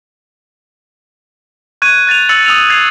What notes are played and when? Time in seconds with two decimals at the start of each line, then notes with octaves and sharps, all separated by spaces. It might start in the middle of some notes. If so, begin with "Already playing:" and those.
1.82 C#6 F#6 G#6 D#7
2.07 F#6 A6 D#7 F7
2.29 E6 A6 C#7 F#7
2.46 D#6 E6 F7
2.70 G#6 A6 C7 F7